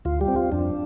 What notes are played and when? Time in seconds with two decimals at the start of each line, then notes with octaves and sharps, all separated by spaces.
0.05 D2 F4
0.21 G3 G4
0.28 C4
0.36 F4
0.52 F2 D4